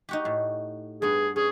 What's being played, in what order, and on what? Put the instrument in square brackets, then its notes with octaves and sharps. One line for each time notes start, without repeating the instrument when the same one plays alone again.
[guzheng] D#4 F#4 G4
A2
[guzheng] G2 B3 [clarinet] G#4
[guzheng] C#4 [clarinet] G#4